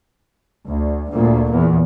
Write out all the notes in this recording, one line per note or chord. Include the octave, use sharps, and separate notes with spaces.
D2
D2 A#2
E2